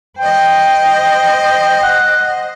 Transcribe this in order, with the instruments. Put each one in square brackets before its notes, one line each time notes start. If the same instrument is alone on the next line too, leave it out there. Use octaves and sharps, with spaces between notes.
[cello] C5 D#5 [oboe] G5
[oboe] F#5